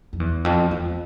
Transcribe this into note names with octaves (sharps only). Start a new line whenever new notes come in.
F2
E2
F2
E2